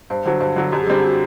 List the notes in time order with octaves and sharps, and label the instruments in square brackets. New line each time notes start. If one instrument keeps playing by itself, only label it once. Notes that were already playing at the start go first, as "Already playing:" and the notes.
[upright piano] G2 [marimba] C5
[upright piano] D3 F#3 [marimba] C5
[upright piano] G2 [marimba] C5
[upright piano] D3 F#3
[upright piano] F#2 [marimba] G4
[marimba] G#4
[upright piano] D3 G3 C4 [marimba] G4
[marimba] F#4